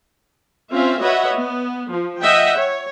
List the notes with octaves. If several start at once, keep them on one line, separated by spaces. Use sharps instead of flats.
C4 C#4 F4 E5 F5
F#4 B4 C#5 D#5 E5 F#5
B3
F3
D#5 E5 F#5 G5
C#5